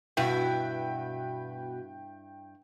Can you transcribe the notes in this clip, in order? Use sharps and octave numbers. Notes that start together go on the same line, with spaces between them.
G2 B2 E4 F#4 B4 G5